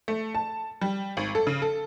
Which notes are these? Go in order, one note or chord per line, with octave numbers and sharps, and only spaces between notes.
A3
A5
G3
G#1
A4
C#3
A4